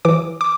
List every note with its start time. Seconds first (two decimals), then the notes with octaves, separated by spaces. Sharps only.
0.05 E3 D6
0.41 D6